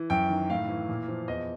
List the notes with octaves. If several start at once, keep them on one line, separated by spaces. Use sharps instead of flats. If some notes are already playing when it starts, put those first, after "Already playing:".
Already playing: E3
F#2 G5
D#3
A2 F5
E3
A#2
F3
E2 D#5